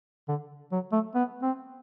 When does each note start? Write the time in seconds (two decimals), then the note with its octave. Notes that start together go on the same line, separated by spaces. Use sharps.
0.28 D3
0.72 F#3
0.92 A3
1.15 B3
1.42 C4